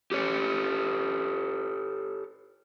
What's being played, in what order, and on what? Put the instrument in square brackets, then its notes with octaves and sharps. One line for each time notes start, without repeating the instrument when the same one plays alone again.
[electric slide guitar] G4 A4 C#5